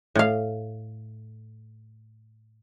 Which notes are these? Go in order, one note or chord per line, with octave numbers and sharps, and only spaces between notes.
A2 F5